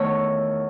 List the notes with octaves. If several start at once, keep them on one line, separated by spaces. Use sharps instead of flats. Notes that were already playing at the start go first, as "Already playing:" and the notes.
Already playing: E2 D#3 A3 C#5